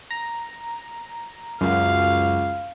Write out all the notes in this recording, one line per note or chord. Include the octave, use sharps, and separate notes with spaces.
A#5
C#2 F#2 F5